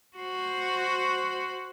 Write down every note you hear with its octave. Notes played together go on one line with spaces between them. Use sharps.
F#4 C5